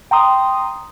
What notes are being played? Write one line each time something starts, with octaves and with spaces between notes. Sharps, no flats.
G5 A#5 C6 D#6